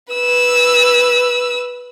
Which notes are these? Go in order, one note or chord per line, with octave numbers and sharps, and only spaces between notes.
B4 E6